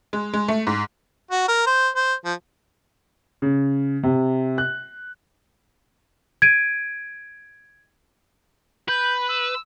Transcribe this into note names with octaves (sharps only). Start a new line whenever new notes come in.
G#3
G#3
A3
G#2
F#4
A#4
C5
C5
F3
C#3
C3
F#6
G#6 D7 D#7
B4 G6
E6